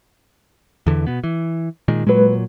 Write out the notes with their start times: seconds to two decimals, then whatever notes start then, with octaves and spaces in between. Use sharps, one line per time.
0.86 E2 D3 E3
1.07 B2 B3
1.24 E3
1.88 A#2 D#3 G#3
2.07 A#2 F#3 G#3 B4